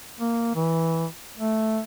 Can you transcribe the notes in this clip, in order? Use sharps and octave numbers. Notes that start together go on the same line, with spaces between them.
A#3
E3
A3